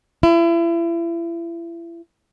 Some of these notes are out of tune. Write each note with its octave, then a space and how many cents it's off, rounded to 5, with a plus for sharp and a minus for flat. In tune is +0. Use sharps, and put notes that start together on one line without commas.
E4 +35